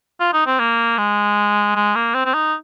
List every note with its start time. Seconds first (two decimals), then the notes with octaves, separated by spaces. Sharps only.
0.20 F4
0.33 D#4
0.46 C4
0.59 A#3
0.98 G#3
1.76 G#3
1.95 A#3
2.14 C4
2.26 C4
2.34 D#4